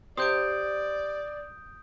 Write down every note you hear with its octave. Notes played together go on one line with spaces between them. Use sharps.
G4 C5 D5 D#6 G6 D7